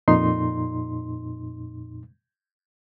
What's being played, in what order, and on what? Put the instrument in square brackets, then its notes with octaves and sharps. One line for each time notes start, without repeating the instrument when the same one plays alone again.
[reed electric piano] F2 A#2 D#4 C6